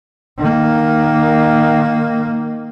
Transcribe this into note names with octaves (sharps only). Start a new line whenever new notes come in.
D#3 A#3